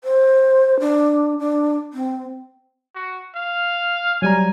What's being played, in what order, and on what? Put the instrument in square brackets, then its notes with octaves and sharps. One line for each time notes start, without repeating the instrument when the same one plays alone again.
[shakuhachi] C5
D4
D4
C4
[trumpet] F#4
F5
[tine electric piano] F#3 G3 A#5 [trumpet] G#5